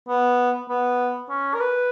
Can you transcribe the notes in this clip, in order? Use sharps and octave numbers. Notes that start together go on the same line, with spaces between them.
B3
B3
C#4
A#4
B4